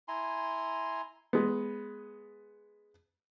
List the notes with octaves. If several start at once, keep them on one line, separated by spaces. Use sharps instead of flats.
E4 G#5 A#5 C6
G#3 B3